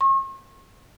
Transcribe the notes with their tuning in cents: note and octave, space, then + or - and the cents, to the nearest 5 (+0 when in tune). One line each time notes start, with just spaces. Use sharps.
C#6 -45